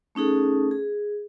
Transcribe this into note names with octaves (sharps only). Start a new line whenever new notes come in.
A3 C#4 D#4 G#4 A4
G#4